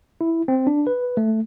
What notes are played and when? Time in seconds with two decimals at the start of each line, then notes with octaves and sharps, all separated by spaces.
0.21 E4
0.48 C4
0.67 D4
0.87 B4
1.17 A3